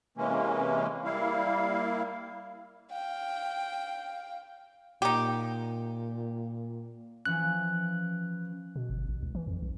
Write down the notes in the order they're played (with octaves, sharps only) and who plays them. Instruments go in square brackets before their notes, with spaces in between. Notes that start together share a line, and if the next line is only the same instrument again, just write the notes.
[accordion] C3 E3 G#3 A#3 C#4
G3 A#3 E4 F5
[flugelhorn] F5 [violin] G5
[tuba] A#2 [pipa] D#4 G4
[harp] E3 F3 C#4 [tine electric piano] F#6
[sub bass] B2
G1
A1
C#2
E3
F2
B1